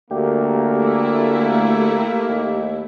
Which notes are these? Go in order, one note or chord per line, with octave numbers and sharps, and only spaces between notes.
D2 A#3 G4
A3 E4
D#2